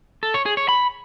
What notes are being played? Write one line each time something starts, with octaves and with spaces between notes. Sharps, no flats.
A4
C#5
G#4
C#5
B5